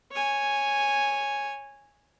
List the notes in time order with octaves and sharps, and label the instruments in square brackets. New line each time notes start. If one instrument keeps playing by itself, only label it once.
[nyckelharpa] C#5 G#5